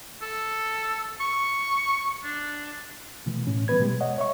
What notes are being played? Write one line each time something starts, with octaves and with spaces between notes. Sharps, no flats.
A4
C#6
D4
B2 E3 A3
A2 C#4
E3 G3 B3 B4 G#6
B2 G3 G#3
C#5 D#5 F#5
C#5 E5 C#6